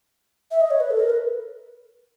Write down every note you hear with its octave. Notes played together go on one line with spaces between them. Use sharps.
E5
D#5
C#5
B4
A4
A#4
B4